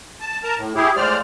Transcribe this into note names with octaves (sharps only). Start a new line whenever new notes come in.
A5
A#4 A5 A#5
A2
E4 G4 G#4
A2 F3 G#3 C5 D5 F6